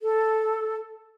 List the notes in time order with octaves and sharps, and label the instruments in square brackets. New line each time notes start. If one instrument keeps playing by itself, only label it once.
[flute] A4